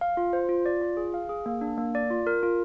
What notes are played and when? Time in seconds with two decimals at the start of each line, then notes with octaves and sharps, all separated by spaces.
0.01 F5
0.17 F4
0.33 C5
0.49 F4
0.66 D5
0.81 F4
0.97 G#4
1.14 F5
1.29 G#4
1.46 A#3
1.61 D4
1.78 A#3
1.95 D5
2.10 F4
2.27 A#4
2.43 F4